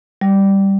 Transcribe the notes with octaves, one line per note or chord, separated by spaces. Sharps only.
G3